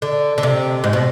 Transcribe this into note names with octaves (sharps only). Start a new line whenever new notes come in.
D3
D3
C3
G#2
B2